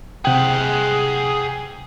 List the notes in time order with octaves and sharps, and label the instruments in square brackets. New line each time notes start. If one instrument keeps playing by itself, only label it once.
[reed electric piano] C3 G5 [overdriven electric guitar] G#4 F#5